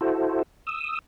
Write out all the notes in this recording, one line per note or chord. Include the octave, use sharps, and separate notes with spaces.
E4 F#4 A4 C5
D#6 E6